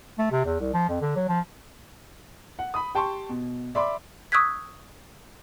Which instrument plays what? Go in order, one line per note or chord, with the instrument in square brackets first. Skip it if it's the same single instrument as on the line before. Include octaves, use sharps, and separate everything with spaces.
[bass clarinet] A3
C3
E2
C2
F3
F2
D3
F#3
F3
[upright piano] F#5
B5 D#6
G4 G5 A5 C6 C#6
B2
D5 E5 B5 C6 D6
[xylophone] C#6 D#6 E6 F#6 G#6 B6